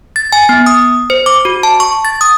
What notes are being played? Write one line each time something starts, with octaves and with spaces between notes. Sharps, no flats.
A6
G#5
B3
D#6
C5
D6
F#4
A5
C#6
A6
D#6